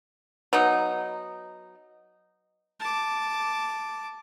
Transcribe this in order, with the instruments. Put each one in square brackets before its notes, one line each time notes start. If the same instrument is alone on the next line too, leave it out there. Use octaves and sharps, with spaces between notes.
[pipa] F#3 B3 D#4
[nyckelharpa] A5 D6